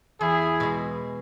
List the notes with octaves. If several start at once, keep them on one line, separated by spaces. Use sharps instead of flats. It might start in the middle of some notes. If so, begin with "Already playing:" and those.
E2 E4 G#4
B2 G#3